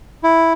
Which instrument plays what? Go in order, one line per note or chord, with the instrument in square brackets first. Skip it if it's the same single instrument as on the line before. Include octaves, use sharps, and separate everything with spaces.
[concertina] E4